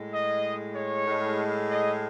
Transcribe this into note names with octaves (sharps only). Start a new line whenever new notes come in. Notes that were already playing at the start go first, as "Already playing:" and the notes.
Already playing: A2 G#3
D#5
C#5
A2 G#3
D#5